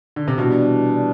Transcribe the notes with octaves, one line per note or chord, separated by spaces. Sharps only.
D3
C3
B2 E3 G3 D4